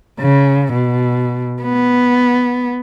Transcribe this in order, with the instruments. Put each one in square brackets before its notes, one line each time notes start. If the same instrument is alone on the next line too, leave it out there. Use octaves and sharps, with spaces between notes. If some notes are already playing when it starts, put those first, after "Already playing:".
[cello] C#3
B2
B3